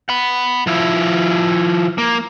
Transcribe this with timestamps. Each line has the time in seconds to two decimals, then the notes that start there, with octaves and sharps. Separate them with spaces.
0.09 F#5 B5
0.67 F3 E4
1.98 A#3